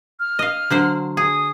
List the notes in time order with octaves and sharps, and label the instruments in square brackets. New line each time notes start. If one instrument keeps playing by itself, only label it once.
[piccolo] F6
[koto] D#5 F5
D3 F#3 C5
[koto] G#4 [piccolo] D#6